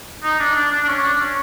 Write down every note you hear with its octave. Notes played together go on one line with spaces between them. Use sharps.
D#4
D4
D4
D4
D4
C#4
D4
C#4